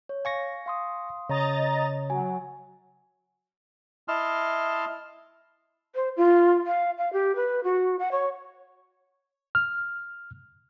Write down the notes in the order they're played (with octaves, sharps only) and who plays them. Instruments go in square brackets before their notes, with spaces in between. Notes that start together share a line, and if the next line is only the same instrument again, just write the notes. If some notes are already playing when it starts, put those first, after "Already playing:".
[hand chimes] C#5
[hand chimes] F5 [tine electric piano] G#5 C#6 A#6
[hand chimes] F5 C6 D#6
[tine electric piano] C#3 [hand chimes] C#5 [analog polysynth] D#5 A#5 A6
[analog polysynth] F#3 [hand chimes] G#5
[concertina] E4 D#5 A5 C6 F6
[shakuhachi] C5
F4
F5
F5
G4
B4
F#4
F#5
C#5
[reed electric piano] F6